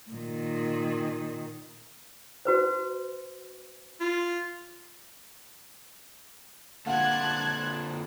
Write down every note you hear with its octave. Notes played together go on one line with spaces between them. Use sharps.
A#2 D#3
F#4 B4 C5
F4
A#2 D3 F5 F#5 A5 F#6 G#6